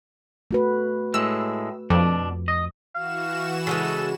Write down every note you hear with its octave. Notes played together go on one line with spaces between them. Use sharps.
A3 F#4 B4
A2 G#3 E6
F2 B2 D4
D#5
E3 F#4 F5 E7
C#3 F3 G#3 A4